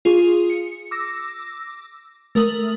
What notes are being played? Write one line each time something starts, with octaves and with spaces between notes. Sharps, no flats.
F4 G#4
C#7
D6 E6 A#6
A3 A#4 D#6 F#7